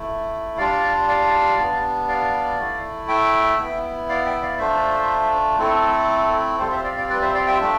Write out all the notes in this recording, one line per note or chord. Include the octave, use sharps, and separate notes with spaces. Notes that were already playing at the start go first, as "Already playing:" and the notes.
Already playing: A3 E4
G3 D4 F4 D5 F5
D5 F5
G3 B3 D4
D5 F5
A3 E4
E5 G5
B3 E4
D5 F5
E5 G5
D5 F5
A3 D4 F4 C5 E5
A3 C4 E4 A4
G3 C4 F4 A4 C5
C5 E5
D5 F5
D5 F5
B4 D5
C5 E5
D5 F5
E5 G5
A3 D4 F4